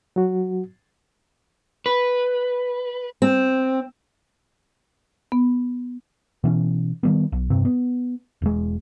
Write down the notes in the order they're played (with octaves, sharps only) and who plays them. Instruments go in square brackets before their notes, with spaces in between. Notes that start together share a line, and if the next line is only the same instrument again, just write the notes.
[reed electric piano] F#3 F#4
[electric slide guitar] B4
[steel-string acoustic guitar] C4
[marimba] B3
[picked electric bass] B2 E3 C#4
D#3 G3 B3
B1
E1 G2 C3 C4
B3
E1 G#3